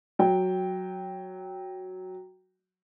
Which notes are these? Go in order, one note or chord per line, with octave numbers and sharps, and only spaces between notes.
F#3 G5